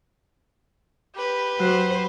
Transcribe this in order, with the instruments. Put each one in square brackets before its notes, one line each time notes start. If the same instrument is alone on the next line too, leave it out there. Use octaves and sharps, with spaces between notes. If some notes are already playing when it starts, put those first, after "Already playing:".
[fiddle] G4 B4
[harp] F#3 F#6 [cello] C5